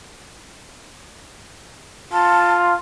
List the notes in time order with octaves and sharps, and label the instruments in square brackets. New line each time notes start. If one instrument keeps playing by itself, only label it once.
[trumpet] F4 [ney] A5